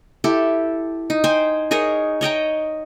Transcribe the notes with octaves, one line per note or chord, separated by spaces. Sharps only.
E4 G4 A4
D#4
C5 G5 G#5
D#4 G#4 A#4 C#5
C#5 D#5 G5 A#5